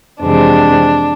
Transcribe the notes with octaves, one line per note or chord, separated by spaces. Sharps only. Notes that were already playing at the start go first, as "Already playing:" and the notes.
F2 C3 E3 G#3 C4 D4